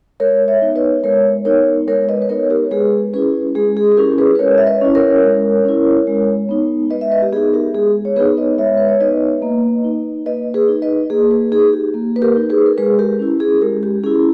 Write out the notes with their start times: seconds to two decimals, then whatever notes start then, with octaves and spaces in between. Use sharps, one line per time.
0.20 G#3 A#4 C#5
0.48 C#5 E5
0.62 B3 D#4
0.76 B4 D#5
1.04 G#3 A#4 C#5
1.45 B3 D#4 A#4 C#5
1.87 G#3 A#4 C#5
2.09 B4 D#5
2.22 B4
2.29 B3 D#4 A#4 C#5
2.50 G4 A#4
2.71 G#3 G#4 B4
3.14 C#4 E4 G#4 B4
3.55 G#3 G#4
3.77 G#4
3.92 G#4
3.97 C#4 E4 G4 A#4
4.18 G#4 B4
4.36 B4
4.39 G#3 A#4 C#5
4.58 E5
4.67 B4 D#5
4.81 C#4 E4
4.95 A#4 C#5
5.23 G#3
5.65 C#4 E4
6.07 G#3
6.49 B3 D#4
6.90 G#3 B4 D#5
7.01 E5
7.12 B4 D#5
7.22 G4
7.33 B3 D#4 G#4
7.53 G4 A#4
7.74 G#3 G#4
8.05 C#5
8.16 B3 D#4 G#4 B4
8.37 B4 D#5
8.58 G#3 C#5 E5
8.77 B4
8.89 C#5
9.00 B3 D#4 B4 D#5
9.42 A#3
9.84 D#4
10.26 A#3 B4 D#5
10.54 G#4 B4
10.68 D#4
10.82 B4 D#5
11.10 A#3 G#4
11.31 G#4 B4
11.52 D#4 G#4
11.73 G4
11.94 A#3
12.16 B4
12.22 G4 A#4
12.36 D#4
12.50 G#4 B4
12.66 A#4
12.78 G#3 G#4 B4
12.99 G4 A#4
13.20 C#4 E4
13.40 G#4
13.61 G#3 G4 A#4
13.83 G4
14.04 C#4 E4 G#4